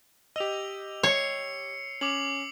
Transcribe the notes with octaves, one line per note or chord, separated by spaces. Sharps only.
G4 D#5 E6 F7
C#5 C7 C#7
C#4 D6 F7 F#7